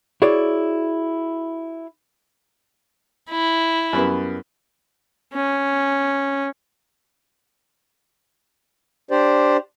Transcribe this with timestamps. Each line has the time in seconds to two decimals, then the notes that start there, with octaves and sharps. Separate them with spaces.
0.22 E4 F#4 G#4 C#5 D5
3.31 E4
3.93 F#2 G3 B3
5.33 C#4
9.11 D4 G4 C5 D5